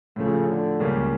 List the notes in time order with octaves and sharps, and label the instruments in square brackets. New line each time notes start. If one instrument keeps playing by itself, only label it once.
[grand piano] A2 F3 A3 [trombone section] C#3
[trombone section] D3
[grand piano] C#2 C#3 G3 A#3 [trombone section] C#4